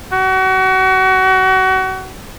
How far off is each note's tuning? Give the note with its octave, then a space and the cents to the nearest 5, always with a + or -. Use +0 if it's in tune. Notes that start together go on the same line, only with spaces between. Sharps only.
F#4 +30